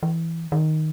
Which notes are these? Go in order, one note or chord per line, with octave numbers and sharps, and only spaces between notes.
E3
D#3